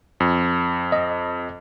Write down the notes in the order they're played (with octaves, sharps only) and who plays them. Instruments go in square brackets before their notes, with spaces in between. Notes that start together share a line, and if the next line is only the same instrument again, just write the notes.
[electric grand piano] F2
[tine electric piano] D#5